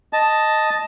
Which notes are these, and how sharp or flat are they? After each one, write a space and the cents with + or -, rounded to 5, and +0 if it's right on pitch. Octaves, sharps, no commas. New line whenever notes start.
D#5 +0 A5 +0